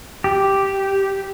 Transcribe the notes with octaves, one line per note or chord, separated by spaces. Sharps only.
G4